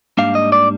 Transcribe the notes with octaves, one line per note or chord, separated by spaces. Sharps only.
G#2 G3 A#3 D4 F5
D#5
D5